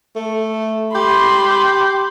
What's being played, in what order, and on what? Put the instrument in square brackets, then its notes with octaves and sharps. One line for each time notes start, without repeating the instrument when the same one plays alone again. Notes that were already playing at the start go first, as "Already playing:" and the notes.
[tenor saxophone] A3
[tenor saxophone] G4 [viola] B5 C6